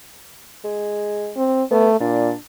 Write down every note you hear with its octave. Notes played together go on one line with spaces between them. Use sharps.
G#3
C4
A3 B3
A#2 D4